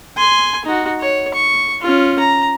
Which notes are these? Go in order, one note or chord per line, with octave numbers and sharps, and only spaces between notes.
G#5 C6
D#4 F#4
C#5
C#6
C#4 F4
A#5